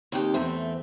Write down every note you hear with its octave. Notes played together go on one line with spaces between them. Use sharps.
D#2 C4 D#4 G4 G5
E2 A3 C4 E5